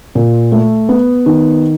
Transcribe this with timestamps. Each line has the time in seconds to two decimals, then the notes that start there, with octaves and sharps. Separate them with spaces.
0.15 A#2
0.52 A3
0.89 B3
1.26 D#3